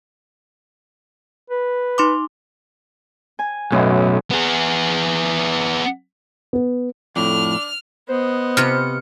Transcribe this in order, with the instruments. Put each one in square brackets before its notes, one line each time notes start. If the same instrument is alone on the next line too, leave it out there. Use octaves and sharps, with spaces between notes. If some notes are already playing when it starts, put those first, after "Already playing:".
[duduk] B4
[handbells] D#4 C6 D6
[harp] G#5
[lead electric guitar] B1 [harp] F#2 A2
[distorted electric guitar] B3 G#4
[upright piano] B3
[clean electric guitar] F2 A2 [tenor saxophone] D4 [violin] F6
[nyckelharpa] B3 D#5 [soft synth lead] C5
[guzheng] C3 F4 B4 [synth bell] F6 C#7